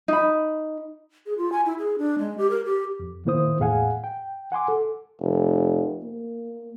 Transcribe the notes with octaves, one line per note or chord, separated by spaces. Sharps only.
D#4 B5
G#4
F4
G#5
E4
G#4
D4
G#3
G4
A#4
G4
F2
A#2 D#3 A#3 E4 C5 D#6
E2 A2 G#4 F5 F#5 G#5
G5
F#5 G#5 C6 D6
A4
F1
A#3